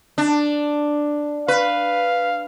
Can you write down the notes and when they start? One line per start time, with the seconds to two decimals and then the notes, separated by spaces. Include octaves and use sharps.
0.18 D4
1.48 B4 F5